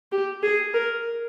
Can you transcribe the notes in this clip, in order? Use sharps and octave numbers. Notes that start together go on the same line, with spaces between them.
G4
G#4
A#4